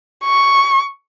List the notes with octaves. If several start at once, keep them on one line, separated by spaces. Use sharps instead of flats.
C#6